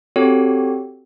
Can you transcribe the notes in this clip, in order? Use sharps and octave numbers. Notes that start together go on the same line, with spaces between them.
C4 F#4 G4 A4 C#5